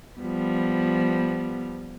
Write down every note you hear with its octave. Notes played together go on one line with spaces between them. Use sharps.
F3 G3 B3